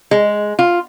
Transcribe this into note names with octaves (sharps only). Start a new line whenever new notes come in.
G#3
F4